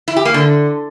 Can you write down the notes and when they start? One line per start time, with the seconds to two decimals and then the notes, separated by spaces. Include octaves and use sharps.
0.08 E4
0.17 G4
0.25 A#3
0.34 D3